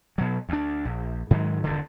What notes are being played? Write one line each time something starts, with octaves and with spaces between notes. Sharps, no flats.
B2 F#3
D2 D4
A#1
G#2 D#3 F#3 G#3
D#1 G2 D3